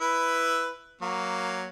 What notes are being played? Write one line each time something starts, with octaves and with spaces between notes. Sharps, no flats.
E4 B4
F#3 A#3